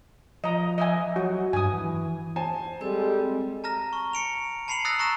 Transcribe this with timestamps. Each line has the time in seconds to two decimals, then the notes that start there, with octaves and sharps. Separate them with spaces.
0.44 F3 D#5 A#5
0.78 D#5 E5 G#5
1.16 F#3 F#4
1.53 G2 G#5 D#6
1.74 E3
2.36 C5 G#5 A5
2.81 G3 G#3 C4 A4 E6
3.64 A5 A#5 F6 A#6
3.93 C#6
4.13 C#7 D7 F7
4.68 A5 B5 C7 C#7 F7 F#7
4.85 D#6 E6 F#6 A6 A#6 C7
4.99 A#5 C#6 F#6 A#6 E7